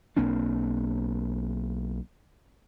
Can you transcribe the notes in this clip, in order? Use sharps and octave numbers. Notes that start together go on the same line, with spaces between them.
B1 A#3 C4 D4